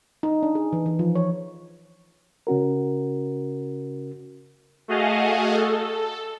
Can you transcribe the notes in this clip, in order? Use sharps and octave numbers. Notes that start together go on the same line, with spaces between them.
D#4
D4
G#4
E3
E3
F3
C#5
C#3 C#4 F#4 A#4
A3 F#4 G#4 D#5 F5
A4